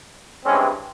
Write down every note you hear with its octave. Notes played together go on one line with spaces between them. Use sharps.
G2 E3 G#3 C4 C#4